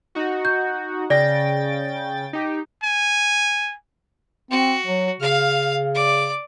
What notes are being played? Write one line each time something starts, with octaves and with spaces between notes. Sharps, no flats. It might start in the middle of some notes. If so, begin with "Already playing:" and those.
D#4 F#4
G6
C#3 D5 G5 A6 A#6
D#4 G4
G#5
C4 F#4
F#3
C#3 F5 F6
D5 D6